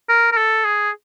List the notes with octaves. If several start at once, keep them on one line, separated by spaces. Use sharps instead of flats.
A#4
A#4
A4
G#4